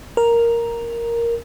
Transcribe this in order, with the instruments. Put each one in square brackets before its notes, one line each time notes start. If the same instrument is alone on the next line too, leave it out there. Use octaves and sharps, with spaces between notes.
[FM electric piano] A#4